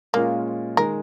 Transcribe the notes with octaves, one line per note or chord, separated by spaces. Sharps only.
A#2 G#3 A#3 C#4 F4
D#3 G#3 A#4